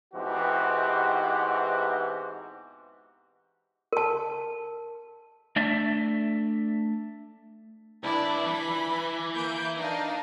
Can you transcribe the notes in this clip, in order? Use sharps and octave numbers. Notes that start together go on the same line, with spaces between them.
G#2 B2 E3 C4 F#4 G4
A#4 A5
A3 D4 D5 E5
C2 D4 E4 B4 D5
E3 B5
A#3 G6 D7
D4 D#4 F5